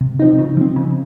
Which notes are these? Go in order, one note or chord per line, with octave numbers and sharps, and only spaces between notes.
C3
F3 C4 D#4
C#3
F3 C4
C#3